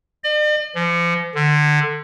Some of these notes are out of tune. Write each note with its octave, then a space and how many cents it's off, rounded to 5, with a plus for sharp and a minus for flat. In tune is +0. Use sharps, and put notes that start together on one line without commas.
D5 +45
F3 -35
D3 +25